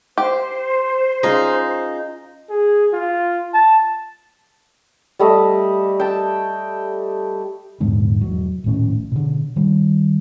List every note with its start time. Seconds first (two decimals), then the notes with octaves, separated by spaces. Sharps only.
0.18 G4 C5
1.23 C#4 D#4 F4 G#4
2.50 G#4
2.93 F4
3.54 A5
5.19 G3 A3 D#5
6.00 G5 A5
7.80 A#1 E2 G#2 D3
8.21 E1 F#3
8.64 A#1 D#2 A2 C#4
9.12 B2 D3
9.56 D#3 G3